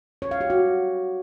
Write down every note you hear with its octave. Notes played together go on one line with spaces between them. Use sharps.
C#5
F5
G4
F#4